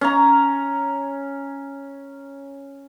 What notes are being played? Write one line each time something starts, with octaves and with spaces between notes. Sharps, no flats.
C#4 A#5